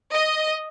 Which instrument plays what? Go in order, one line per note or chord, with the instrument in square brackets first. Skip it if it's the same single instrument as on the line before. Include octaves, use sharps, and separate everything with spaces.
[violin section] D#5